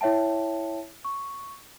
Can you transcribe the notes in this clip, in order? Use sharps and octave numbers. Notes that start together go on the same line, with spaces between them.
E4 C#5 E5 G5 A5
C#6